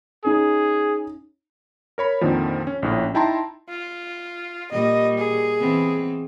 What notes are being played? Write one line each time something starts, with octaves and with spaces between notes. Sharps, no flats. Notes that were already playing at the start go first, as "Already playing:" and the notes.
C#4 D#4 G#4
A#4 C#5 B5
F2 A#2 D3 D#3 F3
C#4
A#1 A2 C#4
D#4 E4 G5 A5 A#5 C6
F4
A#2 G3 D#5
G#4
E3 B3 C4